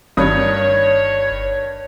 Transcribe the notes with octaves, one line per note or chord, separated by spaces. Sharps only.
G1 G2 D#3 C#5 D#6